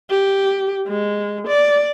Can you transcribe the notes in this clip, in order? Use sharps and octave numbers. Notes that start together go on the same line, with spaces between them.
G4
G#3
D5